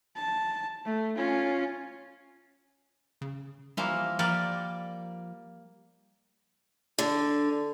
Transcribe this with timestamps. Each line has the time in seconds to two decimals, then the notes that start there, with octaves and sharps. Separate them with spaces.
0.16 A5
0.85 A3
1.16 C#4 F4
3.21 C#3
3.77 E3 F3 G3 A#3
4.19 F3 G3 A#3 D5
6.98 D3